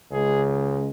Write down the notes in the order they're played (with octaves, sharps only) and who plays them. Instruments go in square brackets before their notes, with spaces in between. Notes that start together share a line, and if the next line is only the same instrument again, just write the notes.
[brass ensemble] C#2 C#3 G#3 G#4